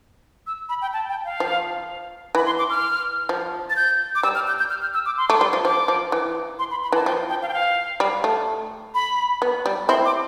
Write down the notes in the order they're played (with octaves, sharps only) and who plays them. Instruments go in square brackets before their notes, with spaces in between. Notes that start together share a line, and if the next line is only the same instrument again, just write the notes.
[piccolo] E6
B5
G5
A5
G5
F5
[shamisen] F3
[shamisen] E3 [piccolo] B5
[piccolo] C6
D6
F6
[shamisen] F3
[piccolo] A6
G6
D6
[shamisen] G3 [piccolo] E6
[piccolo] F6
G6
G6
F6
F6
E6
D6
C6
[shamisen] A3 [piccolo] D6
[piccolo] C6
[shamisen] G3
F3
[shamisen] F3 [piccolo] D6
[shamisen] F3
E3
[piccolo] C6
B5
B5
[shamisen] E3 [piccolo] A5
[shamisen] F3 [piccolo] G5
[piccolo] G5
F5
G5
F5
[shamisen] G3
A3
[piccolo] B5
[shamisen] B3
G3
[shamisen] C4 E4 [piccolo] C6
[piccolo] D6